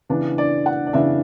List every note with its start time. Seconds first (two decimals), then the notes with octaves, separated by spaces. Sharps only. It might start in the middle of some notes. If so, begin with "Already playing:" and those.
0.10 C#3 E3 B3 D4
0.38 D5
0.66 F#5
0.87 D5
0.93 C#3 E3 B3 D4 E5